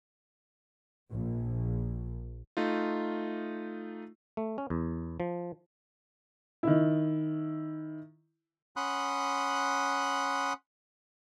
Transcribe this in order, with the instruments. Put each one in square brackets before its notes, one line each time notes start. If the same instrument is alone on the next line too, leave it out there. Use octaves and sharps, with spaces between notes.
[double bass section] A#1
[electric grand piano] A3 D#4 F4
[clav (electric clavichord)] A3
C#4
E2
F3
[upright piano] D#3 E4
[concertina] C#4 F#5 B5 C6 D#6 F#6